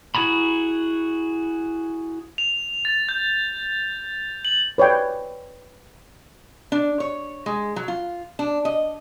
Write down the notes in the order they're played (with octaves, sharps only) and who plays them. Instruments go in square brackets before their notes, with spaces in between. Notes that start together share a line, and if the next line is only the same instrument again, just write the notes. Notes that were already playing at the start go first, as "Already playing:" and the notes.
[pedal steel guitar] E4 F#4 G#4 A#5 B5
[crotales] F7
A6
G6
F#7
[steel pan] B4 C#5 D5 G5
[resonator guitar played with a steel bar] D4
C#5
G#3
F#3
F4
D4
D#5